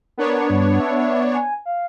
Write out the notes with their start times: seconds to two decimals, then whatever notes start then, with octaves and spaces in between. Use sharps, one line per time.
0.17 B3 D4 A#4 C#5
0.50 G2
0.80 E5
1.34 G#5
1.66 F5